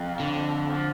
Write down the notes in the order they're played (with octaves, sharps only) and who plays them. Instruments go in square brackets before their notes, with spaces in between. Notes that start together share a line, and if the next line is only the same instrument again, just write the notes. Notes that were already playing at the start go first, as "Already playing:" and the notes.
Already playing: [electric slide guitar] F2
[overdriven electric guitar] D3
[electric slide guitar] F3